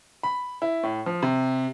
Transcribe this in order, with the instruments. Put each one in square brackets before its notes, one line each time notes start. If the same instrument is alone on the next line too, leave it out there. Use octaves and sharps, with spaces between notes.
[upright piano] B5
E4
A2
F3
C3